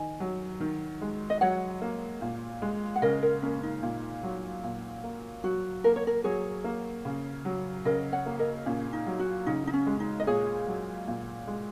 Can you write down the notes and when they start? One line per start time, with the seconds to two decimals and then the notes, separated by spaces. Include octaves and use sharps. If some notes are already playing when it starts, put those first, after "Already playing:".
Already playing: D#3 D#5 G#5
0.20 F#3
0.60 D#3
1.02 G#3
1.30 D#5
1.41 F#3 C#5 F#5
1.82 A#3
2.21 A#2
2.62 G#3
2.96 F#5
3.02 C#3 A#4 D#5
3.23 A#4
3.42 A#3 C#4
3.63 D#4
3.83 A#2
4.23 F#3
4.64 A#2
5.04 A#3
5.44 F#3 F#4
5.84 A#3 A#4
5.96 C#5
6.07 A#4
6.24 F#3 G#4 C#5
6.64 A#3
7.05 C#3
7.45 F#3
7.85 C#3 A#4 D#5
8.12 C#5 F#5
8.26 A#3
8.39 A#4 D#5
8.66 A#2 C#4
8.93 D#4
9.07 F#3
9.20 F#4
9.46 C#3 D#4
9.67 D#4
9.73 C#4
9.87 G#3
10.00 D#4
10.20 D#5
10.27 A#2 G#4 C#5
10.67 F#3
11.08 A#2
11.47 G#3